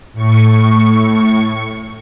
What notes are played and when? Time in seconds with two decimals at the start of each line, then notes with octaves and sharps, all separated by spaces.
0.13 A2 C#6